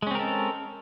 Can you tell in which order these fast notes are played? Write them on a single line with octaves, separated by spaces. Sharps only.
G#3 C#4 C4 A#4 A4